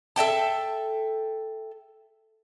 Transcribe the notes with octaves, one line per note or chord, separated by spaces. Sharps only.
A4 E5 G5 A5